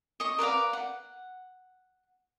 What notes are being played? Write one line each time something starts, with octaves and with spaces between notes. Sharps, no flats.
D#5 C#6
A#4 B4 D5 F5
F#5